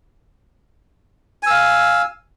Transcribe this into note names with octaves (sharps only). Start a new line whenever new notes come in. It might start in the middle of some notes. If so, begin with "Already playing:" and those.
F5 G#5 E6